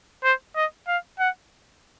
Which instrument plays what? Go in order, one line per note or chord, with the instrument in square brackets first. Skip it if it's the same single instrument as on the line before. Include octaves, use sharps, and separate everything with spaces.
[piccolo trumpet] C5
D#5
F5
F#5